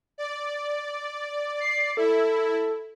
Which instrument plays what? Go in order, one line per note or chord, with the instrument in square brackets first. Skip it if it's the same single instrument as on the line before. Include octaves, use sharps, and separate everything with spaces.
[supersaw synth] D5
[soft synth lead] C7
[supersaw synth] E4 [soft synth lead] A4